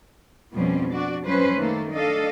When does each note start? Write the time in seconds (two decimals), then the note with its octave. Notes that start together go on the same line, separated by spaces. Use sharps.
0.53 F2 B2 F3 G3 C4 C#4
0.90 D4 F#4 D5
1.25 F#2 F3 G3 C#4 B4 C5
1.57 D#3 A3 A#3 A4
1.94 D4 A4 D#5 F5